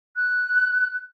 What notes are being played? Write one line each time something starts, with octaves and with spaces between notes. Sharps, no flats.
F#6